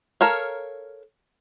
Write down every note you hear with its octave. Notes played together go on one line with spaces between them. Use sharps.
A4 A#4 C#5 F5